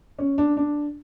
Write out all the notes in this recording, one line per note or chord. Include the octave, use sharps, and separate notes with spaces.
C#4
D4
D4